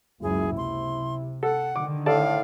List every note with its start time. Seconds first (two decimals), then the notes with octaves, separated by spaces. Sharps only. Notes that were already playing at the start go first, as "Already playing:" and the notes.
0.23 F#1 C#2 F#2 E4 G#4
0.57 C3 C6
1.43 A4 F#5
1.76 D3 D#3 D6
2.06 A2 A4 D5 F5 A5